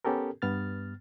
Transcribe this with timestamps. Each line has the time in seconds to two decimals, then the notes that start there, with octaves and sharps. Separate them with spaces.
0.05 B3 C#4 G4 A4 A#4
0.42 G2 B3 F6 A6